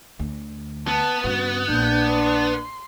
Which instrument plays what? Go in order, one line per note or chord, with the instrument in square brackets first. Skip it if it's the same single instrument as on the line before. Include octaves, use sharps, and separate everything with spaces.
[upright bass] D2
[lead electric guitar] B3 [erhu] A5
[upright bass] G2 C#3 [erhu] F#4
[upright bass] A#1 [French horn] D4 [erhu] G6
[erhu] C6